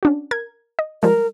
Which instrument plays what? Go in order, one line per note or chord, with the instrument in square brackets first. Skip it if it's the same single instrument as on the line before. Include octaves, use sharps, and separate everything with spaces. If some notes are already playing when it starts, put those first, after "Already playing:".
[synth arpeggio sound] C#4 D4 F#4
A#4 G#6
D#5
[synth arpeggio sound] F3 G3 G#3 [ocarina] A#4